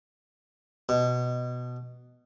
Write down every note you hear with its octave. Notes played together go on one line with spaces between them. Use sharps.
B2